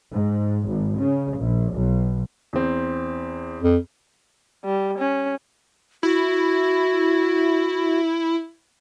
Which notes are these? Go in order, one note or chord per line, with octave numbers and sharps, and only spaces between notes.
G#2
G#1
C#3
A#1
B1
E2 C4
F2
G3
C#4
E4 F#4